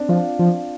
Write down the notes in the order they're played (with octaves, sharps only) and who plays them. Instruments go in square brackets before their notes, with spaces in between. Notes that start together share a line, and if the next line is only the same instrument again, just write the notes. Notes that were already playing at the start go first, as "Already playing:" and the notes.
Already playing: [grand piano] C4 D4
[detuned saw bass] F3 [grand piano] F4
[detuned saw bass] F3